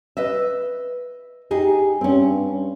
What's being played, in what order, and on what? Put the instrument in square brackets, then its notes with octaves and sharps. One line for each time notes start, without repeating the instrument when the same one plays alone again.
[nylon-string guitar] B4 D#5 E5
[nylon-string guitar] D#4 G#4 [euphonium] G4
[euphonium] G2 [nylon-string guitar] C4 C#4